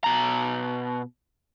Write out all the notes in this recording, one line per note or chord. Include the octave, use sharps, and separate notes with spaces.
B2 A#5